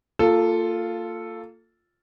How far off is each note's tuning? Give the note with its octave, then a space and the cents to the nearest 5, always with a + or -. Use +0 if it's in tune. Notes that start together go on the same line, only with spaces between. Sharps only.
A#3 -25 F4 +0 A4 +0